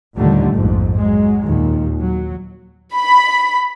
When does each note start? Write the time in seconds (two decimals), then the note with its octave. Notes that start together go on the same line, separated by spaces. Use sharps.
0.17 D#2 A#2 D3 G3 A3
0.54 A#1 F2 G#2
0.98 F#3 G#3
1.46 D#2 A#2
1.99 F#3
2.95 B5